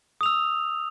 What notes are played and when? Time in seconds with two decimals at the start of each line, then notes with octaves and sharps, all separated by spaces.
0.21 D#6
0.23 F7
0.26 E6